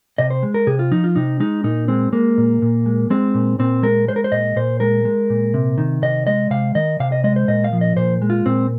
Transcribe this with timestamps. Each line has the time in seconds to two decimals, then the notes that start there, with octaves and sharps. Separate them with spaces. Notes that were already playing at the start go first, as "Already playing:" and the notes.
0.18 C3 D#5
0.30 C5
0.43 G#3
0.54 A#4
0.67 C3 G#4
0.79 F4
0.91 F3 D#4
1.04 F4
1.16 C3 D#4
1.40 G#3 D#4
1.64 A#2 D#4
1.88 G#3 C4
2.13 G#3 A#3
2.38 A#2
2.62 A#2
2.86 G#3
3.10 G#3 C4
3.34 A#2
3.59 A#2 C4
3.83 G#3 A#4
4.08 G#3 C5
4.16 A#4
4.24 C5
4.32 A#2 D#5
4.56 A#2 C5
4.80 G#3 A#4
5.05 G#3
5.30 A#2
5.54 C3
5.78 D#3
6.02 C3 D#5
6.27 G#3 D#5
6.51 C3 F5
6.75 D#3 D#5
7.00 C3 F5
7.12 D#5
7.24 G#3 D#5
7.36 C5
7.48 A#2 D#5
7.64 F5
7.73 F3
7.81 D#5
7.97 A#2 C5
8.22 G#3
8.30 F4
8.46 A#2 C4